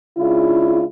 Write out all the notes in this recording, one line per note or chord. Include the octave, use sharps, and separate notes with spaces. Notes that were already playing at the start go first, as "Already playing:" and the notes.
C#3 G#3 D4 E4 F4